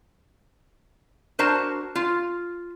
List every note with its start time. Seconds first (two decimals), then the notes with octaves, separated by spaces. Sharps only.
1.39 D4 F#4 A#4 C5 A5
1.95 F4